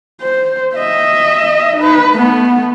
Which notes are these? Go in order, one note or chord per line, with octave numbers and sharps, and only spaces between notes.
C5
D#5 E5
D#4 B4
A3 B3